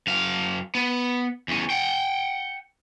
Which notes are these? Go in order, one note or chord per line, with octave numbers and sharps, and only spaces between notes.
F#2 F5
B3
E2 C#4
F#5 G5